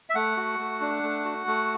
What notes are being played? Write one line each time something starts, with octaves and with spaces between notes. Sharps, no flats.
E5
A3 F#5
F#4
A3
D4
A3
F#4
A3